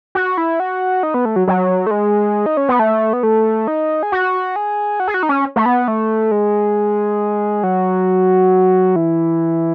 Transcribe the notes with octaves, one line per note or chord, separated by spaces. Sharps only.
F#4
E4
F#4
D#4
B3
A3
F#3
F#3
A3
G#3
D#4
C#4
B3
A3
B3
A3
D#4
G#4
F#4
G#4
F#4
G#4
F#4
D#4
C#4
A3
B3
A3
G#3
F#3
E3